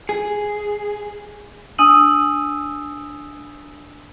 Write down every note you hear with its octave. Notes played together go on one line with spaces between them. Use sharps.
G#4
D4 G#5 D#6 E6 D#7 F#7